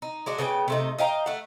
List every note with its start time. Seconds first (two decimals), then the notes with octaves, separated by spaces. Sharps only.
0.02 D#4
0.26 G#3 D4 F#4
0.38 C#3 B3 A#4 G5
0.68 C3 A3 D#4
0.98 D#5 F5 G5 A#5
1.26 A3 F#5